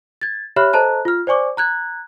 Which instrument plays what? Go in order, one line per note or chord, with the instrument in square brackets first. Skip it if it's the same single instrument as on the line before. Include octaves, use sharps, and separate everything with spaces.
[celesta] G#6 A6
G4 C#5 E5 B5 F6 F#6
A4 C5 D#5 A5 A#5 F#6
F4 F6
C5 D5 G#5 C#6 D6
A#5 F#6 G#6